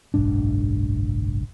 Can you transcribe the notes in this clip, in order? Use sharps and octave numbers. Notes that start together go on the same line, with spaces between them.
F#1 B1 G#2 D4